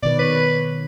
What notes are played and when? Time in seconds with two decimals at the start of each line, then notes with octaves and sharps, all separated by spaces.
0.03 B2 D#3 B4 D5
0.19 B4 C#5